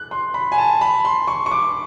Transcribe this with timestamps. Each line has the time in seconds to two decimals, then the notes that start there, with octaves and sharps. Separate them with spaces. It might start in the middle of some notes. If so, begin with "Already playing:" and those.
Already playing: F#6
0.11 C6
0.34 B5
0.52 G#5
0.58 A5
0.81 B5
1.05 C6
1.27 C#6
1.46 C#6
1.51 D6